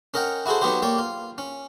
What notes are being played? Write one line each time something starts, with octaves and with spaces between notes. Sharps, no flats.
C#4 A#4 D#5 F#5 G5
E4 F#4 G#4 A4 C5
F#3 B3 D#4 F#4 G4 C5
A#3 G4 C#5 D5
F4
C#4